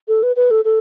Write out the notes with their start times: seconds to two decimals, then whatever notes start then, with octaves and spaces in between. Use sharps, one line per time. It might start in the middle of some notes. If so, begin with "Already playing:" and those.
0.08 A4
0.23 B4
0.36 B4
0.51 A4
0.65 A4